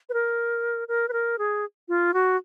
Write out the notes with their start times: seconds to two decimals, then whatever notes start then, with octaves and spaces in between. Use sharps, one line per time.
0.09 B4
0.14 A#4
0.88 A#4
1.09 B4
1.13 A#4
1.38 G#4
1.88 F4
2.14 F#4